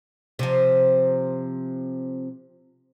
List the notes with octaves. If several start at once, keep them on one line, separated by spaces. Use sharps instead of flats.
C3 F3